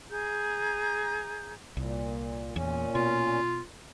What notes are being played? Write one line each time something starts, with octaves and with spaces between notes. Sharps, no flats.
G#4 A#5 G6
C2 A#2
E2 A#2 C#4
B2 F4